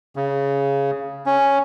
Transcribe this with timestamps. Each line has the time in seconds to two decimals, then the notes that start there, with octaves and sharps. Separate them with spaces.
0.16 C#3
1.26 C#4